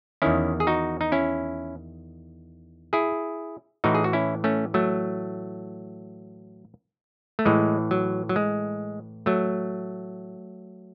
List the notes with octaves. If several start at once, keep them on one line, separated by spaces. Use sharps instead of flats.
E2 D#3 C#4 E4
G#4
D#4 F#4
D#4
C#4 E4
E4 G#4
A2 E3 D#4 F#4
G#4
F#4
C#4 E4
A3 C#4
F#3 A3
A3
A2 E3 G#3
F#3
F#3
G#3
F#3 A3